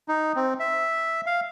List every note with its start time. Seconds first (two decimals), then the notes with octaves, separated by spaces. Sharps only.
0.08 D#4
0.36 C4
0.60 E5
1.26 F5